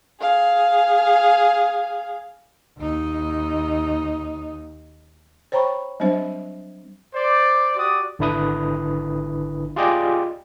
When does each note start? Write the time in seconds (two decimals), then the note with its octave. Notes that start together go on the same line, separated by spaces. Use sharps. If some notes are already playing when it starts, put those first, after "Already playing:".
0.21 G#4 F5
2.78 D#2 D#4
5.52 C5 C#5 G5 A#5 B5 C#6
6.00 F#3 G3 C4 D4 C5 E5
7.14 C5 D5
7.76 F#4 G4 D5 D#6
8.19 G#1 D3 D4 E4 B4 D#6
9.76 F4 G4 G#4 D5 D#5 G5